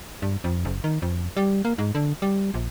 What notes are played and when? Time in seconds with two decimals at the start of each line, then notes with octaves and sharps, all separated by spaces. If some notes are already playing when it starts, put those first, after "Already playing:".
0.22 G2
0.44 F2
0.65 F#1
0.84 D#3
1.02 F2
1.37 G3
1.65 A#3
1.78 G#2
1.95 D3
2.22 G3
2.54 A#1